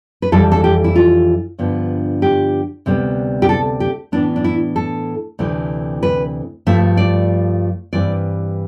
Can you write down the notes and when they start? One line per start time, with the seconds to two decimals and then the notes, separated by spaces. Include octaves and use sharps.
0.22 B4
0.32 F2 E3 G3 A4
0.52 A4
0.64 G4
0.84 E4
0.96 F4
1.58 G2 D3 F3 B3
2.22 G4
2.86 D2 C3 G3 B3
3.42 G4
3.49 A4
3.80 G4
4.12 A2 E3 B3 D4
4.36 D4
4.44 E4
4.76 A4
5.39 D2 C3 E3 A3 C4
6.03 B4
6.66 G2 F3 A3 E5
6.97 D5
7.93 G2 E3 G3 C4 D5